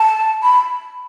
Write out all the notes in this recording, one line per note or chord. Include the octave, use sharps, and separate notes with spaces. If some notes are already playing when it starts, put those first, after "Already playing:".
Already playing: A5
B5